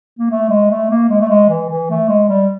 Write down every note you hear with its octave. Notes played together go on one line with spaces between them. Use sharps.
A#3
A3
G#3
A3
A#3
G#3
A3
G#3
E3
E3
A3
G#3
G3